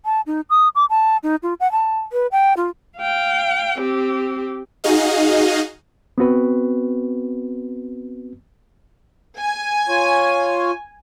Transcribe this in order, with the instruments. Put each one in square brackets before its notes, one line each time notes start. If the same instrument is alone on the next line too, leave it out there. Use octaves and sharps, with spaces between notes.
[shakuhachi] A5
D#4
D#6
D6
A5
D#4
F4
F#5
A5
B4
G5
F4
[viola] F5 G5
C4 G4
[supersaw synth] D#4 F#4 G#4 D#5 F5
[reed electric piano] B3 C4 F#4 B4
[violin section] G#5
[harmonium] F4 C#5